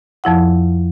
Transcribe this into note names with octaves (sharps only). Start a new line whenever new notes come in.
F2 F3 E4 F#5